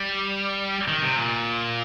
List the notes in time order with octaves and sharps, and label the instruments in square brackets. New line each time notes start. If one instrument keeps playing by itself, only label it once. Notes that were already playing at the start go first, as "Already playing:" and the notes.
Already playing: [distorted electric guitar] G3
D#3
C3
A#2